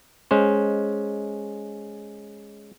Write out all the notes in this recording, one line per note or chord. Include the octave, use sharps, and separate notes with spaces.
G#3 C#4 C5